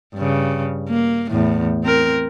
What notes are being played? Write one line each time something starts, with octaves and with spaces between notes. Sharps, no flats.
G2 C#3
A#3
E2 A2
C4 A#4